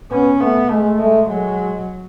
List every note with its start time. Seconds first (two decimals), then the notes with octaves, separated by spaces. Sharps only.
0.11 B3 C#4
0.40 A3 B3
0.70 G#3 A3
0.99 G#3 A3
1.29 F#3 G#3